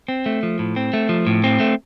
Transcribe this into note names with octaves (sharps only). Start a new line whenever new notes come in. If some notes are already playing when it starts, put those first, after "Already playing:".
C4
A3
F3
A2
C4
A3
F3
A2
C4
A3